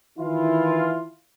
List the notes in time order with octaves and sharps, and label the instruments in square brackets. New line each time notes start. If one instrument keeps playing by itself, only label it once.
[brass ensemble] D#3 E3 E4 F4